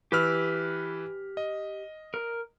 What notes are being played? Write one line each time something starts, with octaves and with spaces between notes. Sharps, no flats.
E3 G4 B4 E6 F6
D#5
A#4